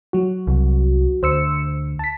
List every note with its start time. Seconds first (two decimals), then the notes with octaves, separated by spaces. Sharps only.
0.13 F#3 F#4
0.47 C2
1.23 D2 C5 E6 C#7
1.99 A5 B6